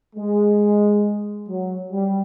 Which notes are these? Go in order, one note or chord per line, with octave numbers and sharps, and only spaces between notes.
G#3
F#3
G3